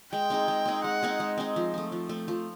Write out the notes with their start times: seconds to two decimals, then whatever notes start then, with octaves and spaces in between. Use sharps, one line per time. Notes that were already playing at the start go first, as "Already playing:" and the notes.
0.12 G#3 G5
0.30 C4 D#4 G#4
0.48 G#3
0.66 C4 D#4 G#4
0.84 G#3 F#5
1.03 C4 D#4 G#4
1.20 G#3
1.38 C4 D#4 G#4
1.56 F3
1.74 A3 C4
1.92 F3
2.09 A3 C4
2.28 F3